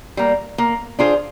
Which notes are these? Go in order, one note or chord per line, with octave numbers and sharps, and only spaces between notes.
G3 A#3
A#3
D4 F4 G#4 C5